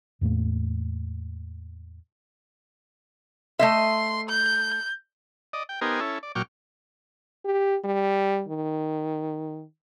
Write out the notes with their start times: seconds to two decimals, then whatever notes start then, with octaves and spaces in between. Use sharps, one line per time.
0.21 E2 A2 A3 A#3
3.59 A3 D#5 E5 C6
4.29 G6
5.53 D5 D#5
5.69 G5
5.81 B3 D#4 G4 A#4 C5 G#5
6.00 C#4 E4 A4
6.23 D5
6.35 A#2 F#3 G5 C#6 D6 F6
7.45 G4
7.84 G3
8.49 D#3